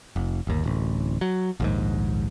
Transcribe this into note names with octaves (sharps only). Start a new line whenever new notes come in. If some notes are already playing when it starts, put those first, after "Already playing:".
F1
G1 D#2
D1 A1
F#3
A#1 D#2 G#2